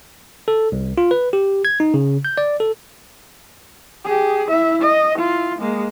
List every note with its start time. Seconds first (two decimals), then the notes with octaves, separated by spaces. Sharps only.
0.48 A4
0.72 C2
0.98 F4
1.11 B4
1.33 G4
1.65 G#6
1.80 D#4
1.94 C#3
2.25 G6
2.38 D5
2.60 A4
4.05 G4 G#4
4.50 E4 E5
4.82 D#5
5.15 E4 F4
5.59 G#3 A#3